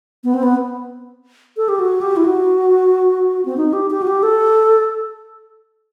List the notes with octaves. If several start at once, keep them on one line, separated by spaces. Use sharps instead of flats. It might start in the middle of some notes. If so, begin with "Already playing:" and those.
B3
C4
B3
A4
G4
F#4
G4
E4
F#4
C4
D#4
G4
G4
F#4
G4
A4